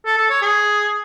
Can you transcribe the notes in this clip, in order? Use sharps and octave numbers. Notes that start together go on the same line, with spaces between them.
A4
A4
C#5
G#4